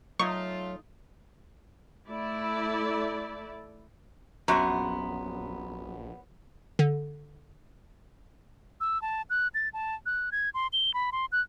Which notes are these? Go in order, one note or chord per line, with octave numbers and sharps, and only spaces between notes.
F#3 A3 D#4 F4 C#6
A3 E4 D5
A#1 F#2 B3 F#4 E5 A#5 C6
D3
E6
A5
F#6
A6
A5
F#6
G#6
C6
G7
B5
C6
F#6